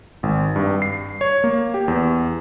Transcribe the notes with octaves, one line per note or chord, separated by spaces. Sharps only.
G#1
G2
C7
C#5
A#3
G4
E2